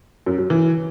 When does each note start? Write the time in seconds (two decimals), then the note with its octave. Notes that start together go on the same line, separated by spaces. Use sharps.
0.26 F#2
0.38 F#3
0.50 E3